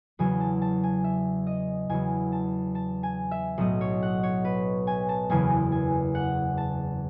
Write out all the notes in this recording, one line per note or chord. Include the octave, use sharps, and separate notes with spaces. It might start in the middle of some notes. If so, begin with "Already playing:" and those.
E2 C#3 F#3 G#5
A5
A5
G#5
E5
D#5
E2 C#3 F#3 G#5
A5
A5
G#5
E5
B1 A2 F#3 D#5
C#5
F#5
C#5
B4
G#5
A5
F#1 E2 C#3 G#5
G#5
F#5
A5